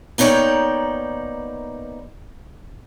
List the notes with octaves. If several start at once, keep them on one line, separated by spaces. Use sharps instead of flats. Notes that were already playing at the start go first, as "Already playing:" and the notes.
A#3 B3 D#4 C#5 D5 G5